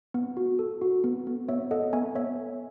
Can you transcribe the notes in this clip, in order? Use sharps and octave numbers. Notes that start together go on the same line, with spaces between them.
B3
F#4
A4
F#4
B3
B3
B3 C#5 E5
A4 D#5 F#5
B3 E5 G#5
B3 C#5 E5